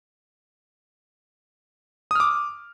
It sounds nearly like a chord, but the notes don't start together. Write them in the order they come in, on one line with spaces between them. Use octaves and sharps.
D#6 F6 D6